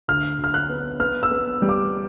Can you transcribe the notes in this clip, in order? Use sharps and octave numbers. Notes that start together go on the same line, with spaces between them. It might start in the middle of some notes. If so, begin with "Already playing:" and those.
D2 F6
D2
F6
F#6
B3
B3 F6
E6
B3
G3
D6